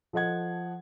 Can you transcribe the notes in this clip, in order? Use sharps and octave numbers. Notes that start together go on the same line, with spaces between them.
F3 A4 D#5 F#5 G#6